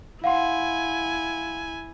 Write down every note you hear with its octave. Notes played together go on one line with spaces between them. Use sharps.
E4 F5 F#5 G#5 C6